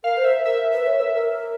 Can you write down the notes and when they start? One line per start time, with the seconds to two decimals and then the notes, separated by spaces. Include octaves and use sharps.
0.04 A#4 F5
0.17 C5
0.25 E5
0.45 A#4 E5
0.73 B4
0.87 C#5
1.01 A#4
1.14 A#4